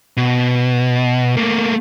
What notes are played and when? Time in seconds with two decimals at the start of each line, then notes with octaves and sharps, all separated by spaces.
0.17 B2
1.37 A3 A#3